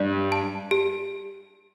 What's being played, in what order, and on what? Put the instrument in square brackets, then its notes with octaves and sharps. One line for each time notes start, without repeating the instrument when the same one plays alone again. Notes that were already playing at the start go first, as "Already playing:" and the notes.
Already playing: [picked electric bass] G2 [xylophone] D5
[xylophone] A5
G4